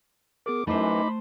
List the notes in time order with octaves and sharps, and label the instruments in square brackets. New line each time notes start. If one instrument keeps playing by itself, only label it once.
[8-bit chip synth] B3 G#4 A#4 [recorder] D6
[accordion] F#2 E3 [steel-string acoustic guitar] A3 C5 [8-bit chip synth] D#4 D#5 D6 [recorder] B5